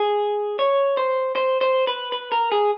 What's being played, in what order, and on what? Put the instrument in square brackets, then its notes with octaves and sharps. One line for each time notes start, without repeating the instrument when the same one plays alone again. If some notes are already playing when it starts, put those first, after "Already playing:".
Already playing: [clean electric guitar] G#4
C#5
C5
C5
C5
B4
B4
A#4
G#4